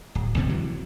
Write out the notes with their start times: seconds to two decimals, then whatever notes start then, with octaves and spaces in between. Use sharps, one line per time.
0.15 D1
0.36 G1 C3 D#3 B3
0.49 E3 F#3